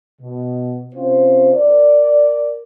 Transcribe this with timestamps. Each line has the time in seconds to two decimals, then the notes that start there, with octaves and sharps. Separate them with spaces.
0.21 B2
0.95 C3 C4 C#4 F4 C5
1.53 A#4 D5